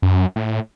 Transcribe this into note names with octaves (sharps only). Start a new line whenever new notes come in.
F#2
A2